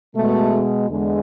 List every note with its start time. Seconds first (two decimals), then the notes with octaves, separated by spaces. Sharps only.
0.16 B2 G#3 A3
0.89 E2 D3 G#3